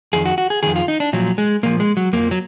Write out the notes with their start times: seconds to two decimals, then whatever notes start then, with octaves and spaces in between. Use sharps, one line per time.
0.13 F2 D#3 G#4
0.26 F#4
0.38 F#4
0.50 G#4
0.63 F2 D#3 G#4
0.76 F4
0.88 D#4
1.00 D4
1.13 A#2 F3 F#3
1.38 G#3
1.63 A#2 F3 A#3
1.80 G#3
1.97 F#3
2.13 F2 F3 A#3
2.31 F#3